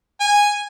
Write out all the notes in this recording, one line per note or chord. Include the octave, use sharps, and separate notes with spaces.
G#5